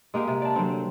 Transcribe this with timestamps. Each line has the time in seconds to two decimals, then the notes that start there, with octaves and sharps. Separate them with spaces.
0.14 G#3 A#3 G4
0.28 C3
0.42 D5 A5
0.56 D3 F#3 C4